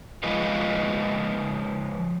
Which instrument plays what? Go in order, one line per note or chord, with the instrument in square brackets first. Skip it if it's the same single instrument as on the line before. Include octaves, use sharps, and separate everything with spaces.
[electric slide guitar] F3 G#3 F4 B4 D#5 F5